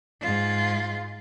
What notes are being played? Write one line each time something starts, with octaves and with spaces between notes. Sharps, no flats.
G#2 F4